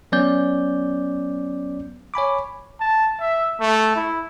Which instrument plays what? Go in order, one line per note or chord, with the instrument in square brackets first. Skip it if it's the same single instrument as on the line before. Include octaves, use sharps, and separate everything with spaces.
[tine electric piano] F#3 B3 C#4 D5 G6
C#5 G#5 B5 D6
[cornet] A5
E5
A3
E4